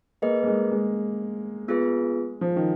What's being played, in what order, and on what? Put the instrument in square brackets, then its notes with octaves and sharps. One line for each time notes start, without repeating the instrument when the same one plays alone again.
[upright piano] A#3 [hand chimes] G#4 B4 D#5
[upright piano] A#3
G#3
G#3
[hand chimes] B3 F4 G#4 B4
[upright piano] F3
D#3